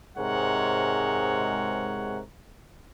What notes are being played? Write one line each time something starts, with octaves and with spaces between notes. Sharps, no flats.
G#2 C3 G#3 A#4 C#5 F#5